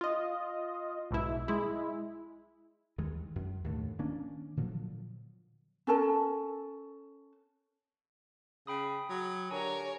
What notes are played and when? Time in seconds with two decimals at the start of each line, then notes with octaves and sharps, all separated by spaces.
0.01 F4 D#5
1.11 B1 G#2 B2 E4
1.48 G#3 E4
2.98 D#2 D#3 E3 G#3
3.36 F#2
3.64 D#2 A2 D3 A3
3.99 D#3 A#3 C#4 D4
4.57 A#2 D3 F3 F#3
5.87 C#4 A4 A#4 A5
8.67 C#3 G5 B5 D#6
9.09 F#3
9.51 D3 G4 A#4 C#5 G#5